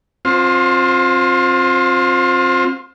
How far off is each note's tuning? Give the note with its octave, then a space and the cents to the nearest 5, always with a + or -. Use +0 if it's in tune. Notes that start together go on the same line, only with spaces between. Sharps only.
C4 +30 F4 +25 C5 +0